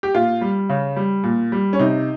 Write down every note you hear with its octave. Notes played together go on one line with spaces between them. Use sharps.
G4
A#2 F4
G3
C#3
G3
A#2
G3
C#4
C3 D#4